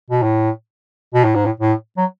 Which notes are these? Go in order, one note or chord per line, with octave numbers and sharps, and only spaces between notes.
B2
A2
B2
A2
G#2
A2
A2
F#3